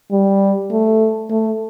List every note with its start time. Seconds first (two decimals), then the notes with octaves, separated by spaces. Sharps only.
0.11 G3
0.71 A3
1.30 A3